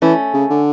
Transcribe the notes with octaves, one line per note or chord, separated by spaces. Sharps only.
E3 A3 C#4
C#3
D3